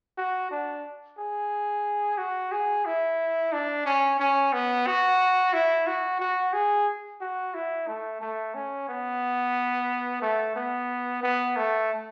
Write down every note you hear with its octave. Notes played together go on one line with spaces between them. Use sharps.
F#4
D4
G#4
F#4
G#4
E4
D4
C#4
C#4
B3
F#4
E4
F#4
F#4
G#4
F#4
E4
A3
A3
C#4
B3
A3
B3
B3
A3